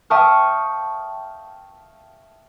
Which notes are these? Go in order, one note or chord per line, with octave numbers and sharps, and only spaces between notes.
E5 G5 A5 C#6 D#6 F6